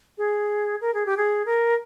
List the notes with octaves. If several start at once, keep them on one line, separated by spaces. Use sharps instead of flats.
G#4
A#4
G#4
G4
G#4
A#4